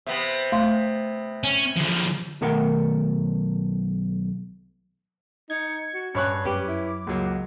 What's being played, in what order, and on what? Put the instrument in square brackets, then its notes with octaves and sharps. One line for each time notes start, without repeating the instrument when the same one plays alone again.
[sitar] C3 B3
[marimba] A3 F5 C6
[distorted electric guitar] C#4
D3 F3
[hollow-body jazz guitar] B1 D#3 A3 A#4 F#5
[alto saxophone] D#4 [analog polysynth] G#6 C#7
[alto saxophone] F#4
[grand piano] G2 C#5 F#6 [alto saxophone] C#4
[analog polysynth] F#2 D6 [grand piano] C#4 B4 [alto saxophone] G4
[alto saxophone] E4
[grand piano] C#2 F#3 [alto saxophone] A#3